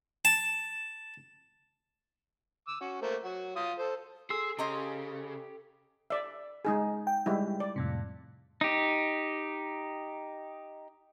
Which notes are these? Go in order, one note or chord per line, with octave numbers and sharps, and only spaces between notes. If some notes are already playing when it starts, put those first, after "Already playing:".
A5
D6 E6
C#4 F#4
A3 A#3 C5
F#3 F#4
F4 D#6
A4 C5
G#4 A4 C6 E6
C#3 G4 C5 D#5 A#5
D5 E5
G#3 D#4 G#4
G5
G3 G#3 E4
D5
F2 A2 C3
D#4 G4